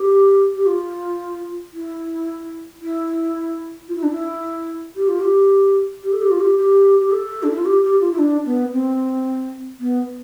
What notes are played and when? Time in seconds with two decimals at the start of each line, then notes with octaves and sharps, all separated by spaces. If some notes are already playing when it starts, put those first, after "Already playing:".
Already playing: G4
0.55 G4
0.66 F4
1.74 E4
2.81 E4
3.89 F4
3.95 E4
4.03 D4
4.10 E4
4.96 G4
5.08 F4
5.20 G4
6.03 G4
6.13 A4
6.22 G4
6.31 F4
6.40 G4
6.57 G4
7.00 G4
7.12 A4
7.43 D4
7.50 E4
7.58 F4
7.65 G4
7.83 G4
8.00 F4
8.12 E4
8.19 D4
8.46 B3
8.73 C4
9.80 B3